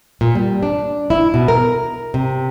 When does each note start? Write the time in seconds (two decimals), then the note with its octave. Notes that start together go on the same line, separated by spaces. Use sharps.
0.21 A#2
0.35 G3
0.63 D4
1.10 E4
1.34 B2
1.48 A#4
2.14 C3